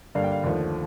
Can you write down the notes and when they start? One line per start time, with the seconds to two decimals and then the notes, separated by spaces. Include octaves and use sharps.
0.15 G2 D3 G3 A#3 F5
0.24 G5
0.32 F5
0.43 D#2 D3 F3 A3